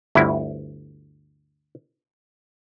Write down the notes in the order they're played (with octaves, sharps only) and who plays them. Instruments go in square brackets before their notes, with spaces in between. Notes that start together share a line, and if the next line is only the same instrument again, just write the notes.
[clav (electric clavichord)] G1 D2 E4